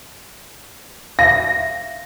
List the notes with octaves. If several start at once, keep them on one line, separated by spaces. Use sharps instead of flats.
E5 F5 A#6